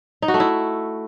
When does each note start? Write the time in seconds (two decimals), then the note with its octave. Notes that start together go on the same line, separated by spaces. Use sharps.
0.22 D#4
0.28 F#4
0.34 A3
0.40 E4